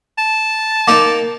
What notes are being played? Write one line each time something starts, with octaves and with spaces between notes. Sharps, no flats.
A5
A#3 D#4 A#4 D6